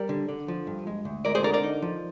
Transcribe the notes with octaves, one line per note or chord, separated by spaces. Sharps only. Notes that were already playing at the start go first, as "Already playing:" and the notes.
Already playing: G3 A#4 D5
D3
D3
F3
G2
G#3
D2
G#3 A#4 D5
G#4 C5
D3 A#4 D5
A#4 D5
D#4
F3